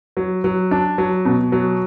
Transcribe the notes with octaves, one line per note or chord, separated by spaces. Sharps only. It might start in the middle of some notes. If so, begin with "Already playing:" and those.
F#3
F#3
D4
F#3
B2
F#3